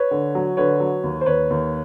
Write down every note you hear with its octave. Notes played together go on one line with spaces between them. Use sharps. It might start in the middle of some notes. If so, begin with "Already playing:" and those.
Already playing: B4 C#5
D3
F#3
D3 B4 C#5
F#3
D#2
C5
D#2 B4 C#5
D#2